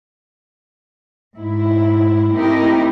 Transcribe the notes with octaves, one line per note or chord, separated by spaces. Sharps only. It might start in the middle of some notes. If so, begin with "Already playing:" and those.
G#2 E4
A3 C4 D#4 E4 G4 A#4